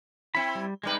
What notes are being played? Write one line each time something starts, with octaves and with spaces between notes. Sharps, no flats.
C4 E4 B5
G3
C3 G3 G#3 D#4 B4